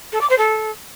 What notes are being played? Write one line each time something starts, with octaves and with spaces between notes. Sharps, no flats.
A4
D6
C5
A4